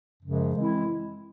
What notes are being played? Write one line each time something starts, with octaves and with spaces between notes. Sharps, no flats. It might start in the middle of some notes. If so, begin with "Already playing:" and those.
F#2 C#3 F3 G#3
E3 G#3 C4 E4